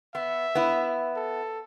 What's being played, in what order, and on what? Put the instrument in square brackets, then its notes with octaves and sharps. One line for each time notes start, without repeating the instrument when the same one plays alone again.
[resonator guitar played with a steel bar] B3 [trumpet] E5
[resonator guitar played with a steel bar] B3 E4
[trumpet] A4